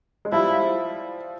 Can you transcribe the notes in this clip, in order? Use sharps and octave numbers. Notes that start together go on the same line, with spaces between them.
G#3
F3 G3 E4